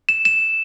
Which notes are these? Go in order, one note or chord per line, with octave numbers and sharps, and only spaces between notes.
E7
E7